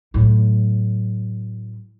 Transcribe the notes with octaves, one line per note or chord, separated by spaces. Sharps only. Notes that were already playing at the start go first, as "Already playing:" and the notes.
A2 F#3